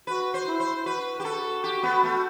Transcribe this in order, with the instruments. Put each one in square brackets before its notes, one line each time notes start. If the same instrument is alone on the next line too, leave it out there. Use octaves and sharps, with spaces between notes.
[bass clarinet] F#4 [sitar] B4
[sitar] C5
[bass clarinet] E4
[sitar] C5
[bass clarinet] F#4 [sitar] B4
[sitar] G4
A4
G4
B3
A3